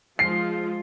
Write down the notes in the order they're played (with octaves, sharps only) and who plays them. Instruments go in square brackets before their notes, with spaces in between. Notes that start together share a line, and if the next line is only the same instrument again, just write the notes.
[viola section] F3 G#3 F4 [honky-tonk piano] C7